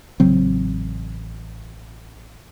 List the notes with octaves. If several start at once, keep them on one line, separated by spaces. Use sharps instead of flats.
A1 C#3 F#3 C4